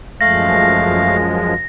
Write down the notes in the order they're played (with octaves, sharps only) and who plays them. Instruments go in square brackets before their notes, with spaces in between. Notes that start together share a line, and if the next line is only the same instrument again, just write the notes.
[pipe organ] F#2 F3 G#3 [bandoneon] A3 F5 [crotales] A#6